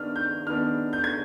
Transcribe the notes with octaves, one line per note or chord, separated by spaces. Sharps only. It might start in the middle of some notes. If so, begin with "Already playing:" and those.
Already playing: D#3 B3 D4 F6
G6
D#3 B3 D4 F6
G6
G#6